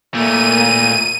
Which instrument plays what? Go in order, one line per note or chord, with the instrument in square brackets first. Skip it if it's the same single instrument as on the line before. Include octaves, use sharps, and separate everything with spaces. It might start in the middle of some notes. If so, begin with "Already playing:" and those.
[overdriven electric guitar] A#2 A3 [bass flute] A#3 [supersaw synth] D#7